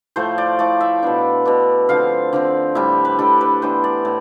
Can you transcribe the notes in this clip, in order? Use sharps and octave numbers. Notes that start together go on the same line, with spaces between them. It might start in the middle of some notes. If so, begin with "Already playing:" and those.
A2 F3 A3 C5
D5
A2 F3 A3 D5
E5
B2 B3 D4
B2 B3 D4
D3 F3 C4 F5
D3 F3 C4
A2 G3 D4 E5
B4
A2 G3 D4 A4
B4
A2 E3 B3 D4 C5
D5
A2